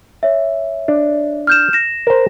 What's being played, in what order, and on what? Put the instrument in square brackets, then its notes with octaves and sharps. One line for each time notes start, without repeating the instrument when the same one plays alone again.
[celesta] C#5 E5
[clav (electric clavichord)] D4
[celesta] F6 G6 E7
A#6 E7
[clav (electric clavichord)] A#4 C5